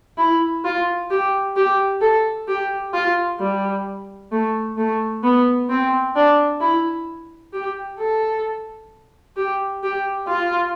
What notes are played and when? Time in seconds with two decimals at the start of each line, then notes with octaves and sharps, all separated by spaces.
0.18 E4
0.65 F4
1.10 G4
1.57 G4
2.01 A4
2.48 G4
2.94 F4
3.40 G3
4.32 A3
4.78 A3
5.24 B3
5.70 C4
6.16 D4
6.61 E4
7.53 G4
7.99 A4
9.37 G4
9.83 G4
10.28 F4